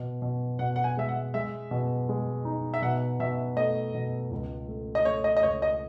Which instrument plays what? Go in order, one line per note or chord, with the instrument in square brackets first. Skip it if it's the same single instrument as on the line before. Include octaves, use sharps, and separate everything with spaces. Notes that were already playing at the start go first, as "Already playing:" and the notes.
Already playing: [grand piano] B2
B2
[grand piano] B2 [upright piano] F#5
[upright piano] F#5
G#5
[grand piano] G#3 [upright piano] E5
[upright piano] F#5
[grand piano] G#3 [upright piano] E5
[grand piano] B2
G#3
D#4
[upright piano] E5
[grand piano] B2 [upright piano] F#5
[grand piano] B2 [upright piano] E5
[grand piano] A3 [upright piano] D#5
[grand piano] B2
C#2
A3
[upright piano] D#5
[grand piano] A3 [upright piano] C#5
[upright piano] D#5
D#5
[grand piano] C#2 [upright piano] C#5
[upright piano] D#5